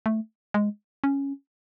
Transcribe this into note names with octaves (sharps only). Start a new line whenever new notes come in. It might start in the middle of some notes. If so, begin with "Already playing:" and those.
A3
G#3
C#4